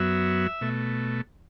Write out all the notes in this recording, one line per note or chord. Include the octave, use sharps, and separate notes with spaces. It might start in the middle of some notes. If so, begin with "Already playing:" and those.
Already playing: F#2 F#3 B3 E5
B2 A3